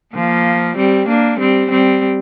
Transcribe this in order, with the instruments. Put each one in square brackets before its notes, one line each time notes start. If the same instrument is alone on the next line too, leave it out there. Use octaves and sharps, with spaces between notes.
[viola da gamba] F3 A#3
G3 C4
A#3 D4
G3 C4
G3 C4